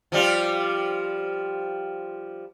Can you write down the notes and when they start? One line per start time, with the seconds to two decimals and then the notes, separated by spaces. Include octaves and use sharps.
0.12 F3 G3 F4